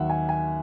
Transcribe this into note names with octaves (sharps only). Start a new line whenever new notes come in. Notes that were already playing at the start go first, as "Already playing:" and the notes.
Already playing: D#2 D#3 F#3 E5 F#5
G#5
G#5